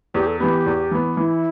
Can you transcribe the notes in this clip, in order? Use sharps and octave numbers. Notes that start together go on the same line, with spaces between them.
E2 G4
A4
E3 B3 G4
E2
E3 B3
E3 E4